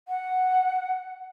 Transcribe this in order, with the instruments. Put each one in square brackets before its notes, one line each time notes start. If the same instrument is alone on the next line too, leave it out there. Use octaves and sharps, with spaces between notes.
[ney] F#5